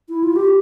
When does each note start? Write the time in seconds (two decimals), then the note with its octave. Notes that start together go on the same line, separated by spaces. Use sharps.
0.09 E4
0.24 F4
0.36 G4